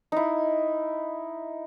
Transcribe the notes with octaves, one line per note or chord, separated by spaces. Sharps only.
D#4 E4